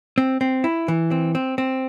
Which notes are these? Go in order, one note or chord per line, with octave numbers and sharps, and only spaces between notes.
C4
C4
E4
E3
C4
C4
C4